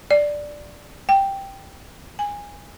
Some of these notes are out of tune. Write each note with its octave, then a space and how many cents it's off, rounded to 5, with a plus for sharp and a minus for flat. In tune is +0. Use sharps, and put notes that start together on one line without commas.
D5 +0
G5 +0
G#5 -20